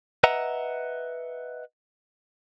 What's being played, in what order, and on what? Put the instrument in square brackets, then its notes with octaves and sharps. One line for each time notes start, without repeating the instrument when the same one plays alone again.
[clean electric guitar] B4 D#5 E5 F#5 A#5